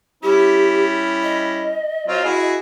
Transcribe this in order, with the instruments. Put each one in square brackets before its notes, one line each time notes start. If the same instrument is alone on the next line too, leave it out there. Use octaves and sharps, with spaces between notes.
[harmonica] G3 C#4 E4 [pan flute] G4
[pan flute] D#5
[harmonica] F#3 C4 F4
E4 F#4 G#4